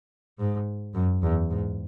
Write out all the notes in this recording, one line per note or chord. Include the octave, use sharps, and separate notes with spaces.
G#2
F#2
E2
G#2